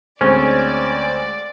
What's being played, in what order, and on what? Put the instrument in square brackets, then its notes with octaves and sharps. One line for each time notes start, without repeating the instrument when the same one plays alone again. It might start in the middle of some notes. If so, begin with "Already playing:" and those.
[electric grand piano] D2 G#3 C4 [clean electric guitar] C#4 [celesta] C5 [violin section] D5